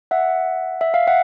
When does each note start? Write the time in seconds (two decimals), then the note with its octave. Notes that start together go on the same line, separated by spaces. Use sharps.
0.11 E5 F#5
0.81 E5
0.94 F5
1.07 E5 F#5